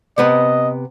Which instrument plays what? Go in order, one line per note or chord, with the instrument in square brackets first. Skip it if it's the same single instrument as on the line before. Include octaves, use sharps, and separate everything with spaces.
[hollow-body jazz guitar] C3 B3 B4 [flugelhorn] D#5